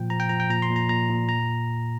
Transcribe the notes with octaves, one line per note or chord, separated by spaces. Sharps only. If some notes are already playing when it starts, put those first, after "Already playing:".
Already playing: A#2 F3 G5
F3 A#5
G5
F3 A#5
G5
A#2 A#5
C6
A#2
A#5
A#2 A#5
A#2
A#5